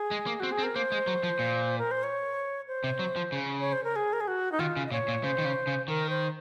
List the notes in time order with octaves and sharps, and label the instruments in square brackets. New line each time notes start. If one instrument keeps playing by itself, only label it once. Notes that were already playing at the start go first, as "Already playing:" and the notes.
Already playing: [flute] G#4
[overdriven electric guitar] G#3
A#3
[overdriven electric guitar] C4 [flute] F#4
[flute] G#4
[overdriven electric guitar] C4
[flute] A#4
[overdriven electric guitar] A#3 [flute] C5
[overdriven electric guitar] G#3
F#3
F3
A#2
[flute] A#4
C5
C#5
C5
[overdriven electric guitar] C3
F#3
F3
C#3
[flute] C#5
C5
A#4
G#4
A#4
G#4
F#4
D#4
[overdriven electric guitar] D#3 [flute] F4
[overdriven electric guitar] C#3
[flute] D#5
[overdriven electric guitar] A#2 [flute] C#5
[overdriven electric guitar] A#2
[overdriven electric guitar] C#3 [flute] C5
[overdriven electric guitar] D#3
C#3
C#3
[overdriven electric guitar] D#3 [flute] A#4
[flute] C5